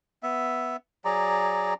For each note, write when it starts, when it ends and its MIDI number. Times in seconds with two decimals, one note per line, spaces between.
0.23 0.77 59
0.23 0.77 76
1.05 1.74 54
1.05 1.74 68
1.05 1.74 74
1.05 1.74 82